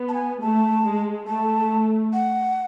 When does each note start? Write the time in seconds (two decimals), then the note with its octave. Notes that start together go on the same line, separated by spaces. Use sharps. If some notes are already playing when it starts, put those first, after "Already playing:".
Already playing: B3
0.09 A5
0.14 G#5
0.42 A3 A5
0.85 G#3
1.27 A3 A5
2.13 F#5